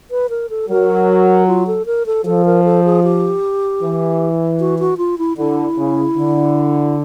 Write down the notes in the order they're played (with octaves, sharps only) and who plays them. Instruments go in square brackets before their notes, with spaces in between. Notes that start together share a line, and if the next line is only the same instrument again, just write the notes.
[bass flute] B4
A#4
A4
[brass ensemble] F#3 [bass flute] A#4
[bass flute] F4
A4
A#4
A4
[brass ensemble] F3 [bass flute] A4
[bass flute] A#4
A4
G#4
G4
[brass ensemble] E3
[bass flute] F#4
F#4
F4
E4
[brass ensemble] D3 [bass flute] E4
[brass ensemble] C#3
D3